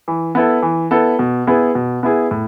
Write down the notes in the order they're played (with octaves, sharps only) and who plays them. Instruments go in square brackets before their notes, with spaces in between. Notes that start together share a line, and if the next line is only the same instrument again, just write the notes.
[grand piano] E3
B3 E4 A4
E3
B3 E4 A4
B2
B3 E4 G#4
B2
B3 E4 G#4
A2